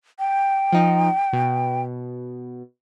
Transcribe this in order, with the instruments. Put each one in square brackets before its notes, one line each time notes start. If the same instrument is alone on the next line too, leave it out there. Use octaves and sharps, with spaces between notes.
[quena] G5
[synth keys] F3 D#4
B2